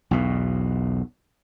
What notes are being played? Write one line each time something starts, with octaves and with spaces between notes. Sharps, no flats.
B1 E2 B2